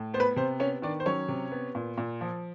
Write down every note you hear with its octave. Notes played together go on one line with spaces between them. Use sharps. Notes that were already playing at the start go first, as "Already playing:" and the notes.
Already playing: A2
B3 C5
B4
C3 C5
B3 C#4 C#5
D#3 D4 D5
C5
F#3 C#4 C#5
C3
B3
A#2
A#2
F3